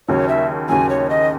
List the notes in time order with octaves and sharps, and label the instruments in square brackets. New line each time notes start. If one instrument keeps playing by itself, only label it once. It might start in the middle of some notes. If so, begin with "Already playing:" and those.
[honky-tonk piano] D#2 C#3 F#3 [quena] C#5
[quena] E5
[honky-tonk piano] D#2 C#3 F#3 [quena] G#5
[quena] C#5
D#5